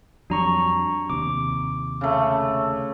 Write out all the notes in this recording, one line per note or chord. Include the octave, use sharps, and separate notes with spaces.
F2 F#3 G3 D4 A#5 C#6
D#2 C3 D6
C#3 A3